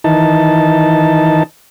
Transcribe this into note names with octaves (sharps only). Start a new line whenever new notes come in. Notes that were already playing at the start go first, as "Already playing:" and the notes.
D#3 E3 D#4 A5